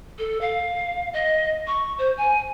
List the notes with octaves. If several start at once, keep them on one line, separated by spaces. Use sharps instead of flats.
A4
F5
D#5
C#6
C5
G#5